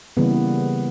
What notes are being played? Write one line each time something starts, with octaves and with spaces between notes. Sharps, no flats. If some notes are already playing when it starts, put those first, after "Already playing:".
C#3 E3 G3 A#3 B3